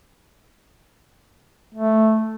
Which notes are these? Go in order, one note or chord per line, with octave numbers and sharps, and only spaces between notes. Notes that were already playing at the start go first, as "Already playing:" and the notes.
A3